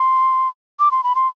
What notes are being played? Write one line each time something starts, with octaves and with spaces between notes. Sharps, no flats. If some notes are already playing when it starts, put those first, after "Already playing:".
Already playing: C6
D6
C6
B5
C6